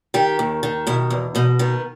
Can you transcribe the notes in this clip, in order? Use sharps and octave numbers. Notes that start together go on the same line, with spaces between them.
D#3 G4
D#2
D#3
B2 E4
E2
B2 D#4
D#3 B3